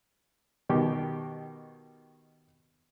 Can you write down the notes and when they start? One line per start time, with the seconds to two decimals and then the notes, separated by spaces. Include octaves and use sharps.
0.69 B2 D#3 G4